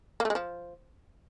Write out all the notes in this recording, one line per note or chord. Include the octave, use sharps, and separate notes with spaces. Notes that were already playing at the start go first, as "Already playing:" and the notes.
A#3
A3
G#3
F3